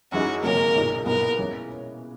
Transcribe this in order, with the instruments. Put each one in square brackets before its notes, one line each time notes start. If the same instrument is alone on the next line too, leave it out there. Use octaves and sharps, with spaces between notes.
[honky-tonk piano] F#2 E3 G#3 D#4 [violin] F#4
[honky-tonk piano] G#1 F#2 C#3 F#3 A#3 [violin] A#4
[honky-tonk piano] B1 A#2 G#3 D#4
[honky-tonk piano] B1 A#2 G#3 B3 E4 [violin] A#4
[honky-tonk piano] E3 G#3 C#4